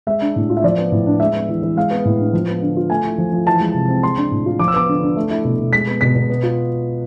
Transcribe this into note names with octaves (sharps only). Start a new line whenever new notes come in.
G#3 E5
D4
A2
F4
E5
F3 D5
B3
A2
D4
G#3 E5
B3
E3
E3
G#3 F5
B3
A2
D4
F3
B3
D3
F4
A3 G#5
E4
F3
F3
E3 A5
G#3
C3
C4
G#3 C6
D4
A2
F4
F3 D6
E6
B3 D6
D3
D4
A3
E4
B2
B2
G#3 B6
B3
B2 B6
B2
B3
F4